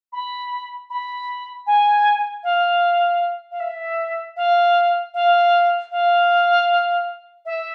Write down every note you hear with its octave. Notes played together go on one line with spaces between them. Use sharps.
B5
B5
G#5
F5
F5
E5
F5
F5
F5
E5